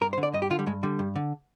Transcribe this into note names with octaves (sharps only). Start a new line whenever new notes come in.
G2 A#4
C5
D3
D5
G2 D#5
G4
D3 F4
G3
G2 G#3
D3 G3
G2
D3